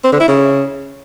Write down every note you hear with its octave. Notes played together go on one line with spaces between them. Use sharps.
C4
D3
E4
C#3